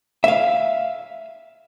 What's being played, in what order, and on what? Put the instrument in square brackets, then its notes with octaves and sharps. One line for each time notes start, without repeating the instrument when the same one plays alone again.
[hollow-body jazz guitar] E5 F5